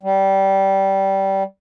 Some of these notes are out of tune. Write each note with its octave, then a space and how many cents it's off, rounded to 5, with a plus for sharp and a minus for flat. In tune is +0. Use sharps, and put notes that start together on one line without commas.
G3 -15